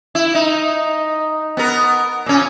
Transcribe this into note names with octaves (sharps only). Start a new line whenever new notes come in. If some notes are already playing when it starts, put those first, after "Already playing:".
E4
D#4
B3 A#4
A#2 C#4